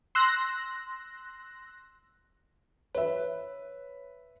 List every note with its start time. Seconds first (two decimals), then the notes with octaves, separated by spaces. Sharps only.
0.15 C6 E6 F#6 A#6
2.95 B4 C#5 E5